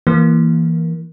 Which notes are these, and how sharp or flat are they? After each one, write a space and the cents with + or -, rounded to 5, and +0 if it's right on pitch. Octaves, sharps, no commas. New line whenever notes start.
E3 +0 A#3 +0